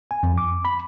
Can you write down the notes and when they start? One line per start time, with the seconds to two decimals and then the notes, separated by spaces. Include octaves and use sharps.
0.11 G#5
0.23 F2
0.38 D6
0.65 B5